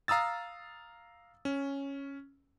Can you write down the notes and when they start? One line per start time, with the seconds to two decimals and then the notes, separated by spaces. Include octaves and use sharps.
0.08 F5 A#5 D#6 E6 A6
1.45 C#4